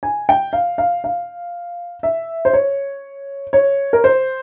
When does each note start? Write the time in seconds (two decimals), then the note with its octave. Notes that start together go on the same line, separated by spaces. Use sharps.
0.03 G#5
0.29 G5
0.53 F5
0.78 F5
1.04 F5
2.03 E5
2.45 C5
2.53 C#5
3.53 C#5
3.93 A#4
4.04 C5